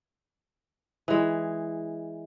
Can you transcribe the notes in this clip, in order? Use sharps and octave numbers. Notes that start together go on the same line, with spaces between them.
E3 G#3